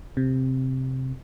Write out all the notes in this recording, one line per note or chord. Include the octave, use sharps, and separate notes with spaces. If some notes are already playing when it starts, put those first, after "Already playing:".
C3